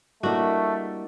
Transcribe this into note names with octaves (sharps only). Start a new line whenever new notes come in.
G3 A3 A#3 D4 E4 F#4 A#4 D#5